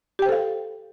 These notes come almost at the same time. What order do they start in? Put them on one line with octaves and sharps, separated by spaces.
G4 G5 C5 A4 F5